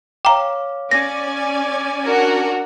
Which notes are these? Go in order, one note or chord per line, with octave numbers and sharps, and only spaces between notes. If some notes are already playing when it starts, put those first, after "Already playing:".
C#5 F5 G5 A#5 D6
C#4 D5 G#5 A#6
D4 F#4 A#4